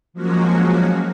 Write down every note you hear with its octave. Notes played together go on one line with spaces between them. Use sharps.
F3 F#3 G#3 A#3 C#4 F#4